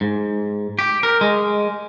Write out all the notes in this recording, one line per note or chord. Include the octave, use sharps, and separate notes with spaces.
G#2
G4
A#4
G#3